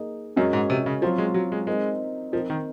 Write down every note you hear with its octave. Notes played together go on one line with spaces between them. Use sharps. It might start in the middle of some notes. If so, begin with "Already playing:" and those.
Already playing: A#3 D#4 G#4 D#5
F#2 G#3 C#4 F#4 A#4 D#5
G#2
C3
C#3
F3 F#3 C4 F4
G#3
F#3
G#3
G#3 C4 D#4 A#4 D#5
F3 C4 D#4 A#4 D#5
D#3